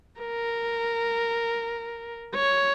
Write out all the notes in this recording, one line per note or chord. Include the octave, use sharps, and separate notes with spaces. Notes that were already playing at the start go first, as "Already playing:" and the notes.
A#4
C#5